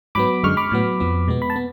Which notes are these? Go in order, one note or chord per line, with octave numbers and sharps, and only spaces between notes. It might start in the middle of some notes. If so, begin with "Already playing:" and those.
G#2 F#3 B3 B5 D6
F#2 D3 G#3 C#6 F6
B5 D6
A2 F#3 B3
F2 F3 B3
B2 G#3 B3
B5
A5
B3